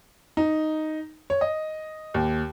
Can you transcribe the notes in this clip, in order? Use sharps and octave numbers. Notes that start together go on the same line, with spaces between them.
D#4
C#5
D#5
D#2